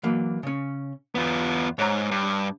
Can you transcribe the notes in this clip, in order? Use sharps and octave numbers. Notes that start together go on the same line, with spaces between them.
E3 F#3 A#3
C#3 C#4
E2 B3 F4
G#2 C#5 A#5
G2